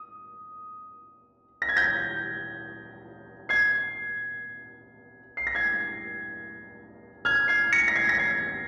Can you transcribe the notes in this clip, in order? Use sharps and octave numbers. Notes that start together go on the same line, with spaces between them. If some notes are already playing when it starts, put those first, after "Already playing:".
Already playing: D#6
A#6
G#6
G6 A#6
G#6 C7
C7
A#6
G#6 C7
F6 G#6
G#6 C7
A#6 C#7
A#6
G#6 C7
A#6
G#6 C7